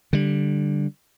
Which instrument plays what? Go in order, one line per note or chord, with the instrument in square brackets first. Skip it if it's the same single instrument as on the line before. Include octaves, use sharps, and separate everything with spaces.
[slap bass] D3 G3